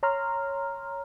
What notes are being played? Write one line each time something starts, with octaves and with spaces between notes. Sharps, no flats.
C#5 A#5 C6 F6